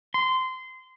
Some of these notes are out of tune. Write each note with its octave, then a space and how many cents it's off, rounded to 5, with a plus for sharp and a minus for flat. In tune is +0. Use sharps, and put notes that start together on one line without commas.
C6 -20